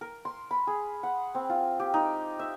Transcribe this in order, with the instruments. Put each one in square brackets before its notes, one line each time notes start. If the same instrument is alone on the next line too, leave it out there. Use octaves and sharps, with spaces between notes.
[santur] A#4
C6
B5
G#4
F#5
C4
F4
G4
D#4
E5